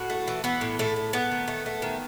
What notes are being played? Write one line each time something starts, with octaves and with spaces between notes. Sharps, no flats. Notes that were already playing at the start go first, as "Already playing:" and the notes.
Already playing: A2 F#4
A3
E3
E3 B3
A2
A2 A3
A3
A3 B3
D#3
A3
A3
D#3